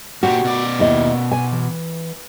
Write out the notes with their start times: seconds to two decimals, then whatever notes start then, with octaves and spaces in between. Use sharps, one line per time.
0.23 A#2 F#4 G4
0.44 B2 D5
0.79 D#2 E4 D#5
1.31 G#5
1.52 E3